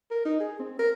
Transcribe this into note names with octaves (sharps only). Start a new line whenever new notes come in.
A#4
D#4
G#4
C4
A#4